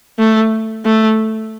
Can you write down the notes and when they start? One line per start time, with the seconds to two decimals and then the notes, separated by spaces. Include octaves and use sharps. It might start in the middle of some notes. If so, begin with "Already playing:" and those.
0.19 A3
0.85 A3